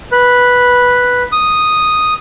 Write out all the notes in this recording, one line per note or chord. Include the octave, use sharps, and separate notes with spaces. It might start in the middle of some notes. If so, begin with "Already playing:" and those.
B4
D#6